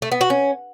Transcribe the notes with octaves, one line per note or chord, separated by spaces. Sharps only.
A3
B3
F#4
C#4